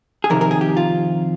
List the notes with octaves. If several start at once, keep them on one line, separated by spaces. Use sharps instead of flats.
G#4
F2 C3 D#3 A#4
A#4
G#4
G4
F4